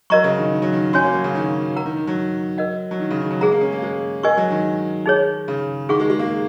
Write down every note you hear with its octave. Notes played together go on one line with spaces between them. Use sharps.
F#3 A#4 D#5 A#5 C#6
C#3
D#3
D#3
F#3
D#3
C#4 F#4 C#5 G#5
A#3
F#3
C#3
D#3
A#4 F#5 A#5
D#3
D#3
F#3
A#4 D#5 F#5
F#3
D#3
C#3
D#3
F#3
G#3 G#4 F#5 A#5
A#3
C#4
A#3
G#3
G#3 A#4 D#5 G#5 C#6
F#3
D#3
D#4 G#4 C#5
C#3
D#3 G#4 F#5 C#6
G#3
G#3
A#3